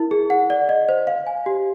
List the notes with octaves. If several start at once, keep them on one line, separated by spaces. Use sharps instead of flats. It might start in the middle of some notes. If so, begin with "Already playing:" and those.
Already playing: E4 A#4
G#4
F#5
D5
D#5
C5
F5
G#5
G4